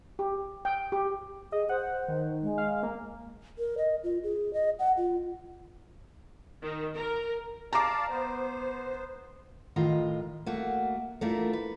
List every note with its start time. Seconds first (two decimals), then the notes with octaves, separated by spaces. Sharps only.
0.19 G4
0.65 G5
0.92 G4
1.52 G#4 D#5
1.69 C5 F#5
2.08 D#3
2.42 G#3
2.58 F5
2.83 A#3
3.58 A#4
3.78 D#5
4.04 F4
4.23 G#4
4.53 D#5
4.79 F#5
4.97 F4
6.63 D#3
6.94 A#4
7.73 D5 F5 A5 A#5 D6
8.09 B3 C5
9.76 A2 D#3 F4 D#5
10.46 A3 A#3 F#4
11.21 A3 A#3 D4 E4 F4 A#4
11.53 B4